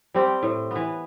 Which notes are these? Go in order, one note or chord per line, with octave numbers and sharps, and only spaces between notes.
G3 C4 G4
A2
E3 B3